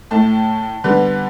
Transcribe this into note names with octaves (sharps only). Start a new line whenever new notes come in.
A2 A3 A5
D3 G3 B3